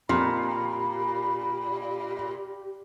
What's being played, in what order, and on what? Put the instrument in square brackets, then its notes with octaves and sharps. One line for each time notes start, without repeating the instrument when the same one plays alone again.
[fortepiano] F2 [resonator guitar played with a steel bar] A#2 [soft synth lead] G4 [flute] B5